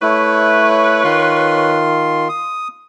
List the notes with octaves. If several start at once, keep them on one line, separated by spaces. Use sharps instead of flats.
A3 E4 B4 C#5
D#3 F4 C6
D#6